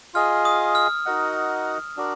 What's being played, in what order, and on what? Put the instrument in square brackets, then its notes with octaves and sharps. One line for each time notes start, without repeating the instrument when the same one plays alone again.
[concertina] F4 G#4 D#5 [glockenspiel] F6
[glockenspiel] D#6
F6
[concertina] D#4 F#4 A#4 D#5 F#5
D4 F#4 A#4 D5